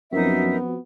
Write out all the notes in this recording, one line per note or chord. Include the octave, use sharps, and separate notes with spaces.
F#2 F3 B3 C4 D#4 F#4 A#4 E5